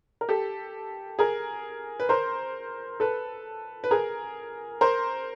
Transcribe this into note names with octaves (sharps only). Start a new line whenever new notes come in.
A#4
G4 A4
G#4 A#4
B4
A#4 C5
A4 B4
B4
G#4 A#4
A#4 C5